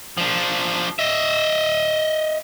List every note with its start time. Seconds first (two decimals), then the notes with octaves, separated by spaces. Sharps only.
0.18 F3 D4
0.99 D#5 E5